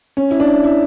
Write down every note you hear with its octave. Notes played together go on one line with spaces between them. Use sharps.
C#4
E4
D4
E4